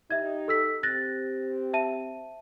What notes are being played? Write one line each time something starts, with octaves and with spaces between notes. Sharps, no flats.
D#4 G4 E5 G#6
A4 E6 B6
C4 G4 F#6 A6 A#6
E5 A5 D#7